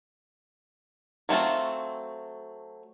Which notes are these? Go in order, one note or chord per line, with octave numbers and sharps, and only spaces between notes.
F#3 A3 C4 F4